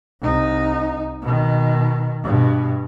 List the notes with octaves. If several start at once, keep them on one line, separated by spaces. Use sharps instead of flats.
C2 D#4
B2 D#3
G2 B2